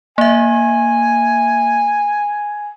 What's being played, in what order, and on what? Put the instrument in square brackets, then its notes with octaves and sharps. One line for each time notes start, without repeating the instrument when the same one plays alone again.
[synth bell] A#3 E5 [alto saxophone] G#5